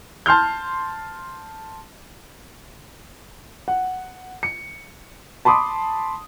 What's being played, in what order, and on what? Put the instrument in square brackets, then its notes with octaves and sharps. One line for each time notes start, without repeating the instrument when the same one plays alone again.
[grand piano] A5 C6 F6 G6
[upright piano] F#5
C#7
A5 B5 C6 D6 D#6